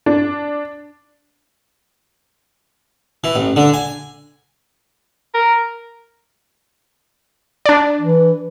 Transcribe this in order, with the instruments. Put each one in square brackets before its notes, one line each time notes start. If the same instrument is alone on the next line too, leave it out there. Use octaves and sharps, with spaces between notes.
[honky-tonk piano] D4
[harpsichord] E3
A1
D3
G#5
[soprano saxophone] A#4
[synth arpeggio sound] D4 D5
[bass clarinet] E3